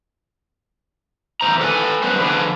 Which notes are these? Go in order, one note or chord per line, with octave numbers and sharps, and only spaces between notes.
E2 G3 C5 A#5
A4 B4 F#5 G#5
F#2 G3 B3 B4 C5
D3 F3 D4 G#4 B4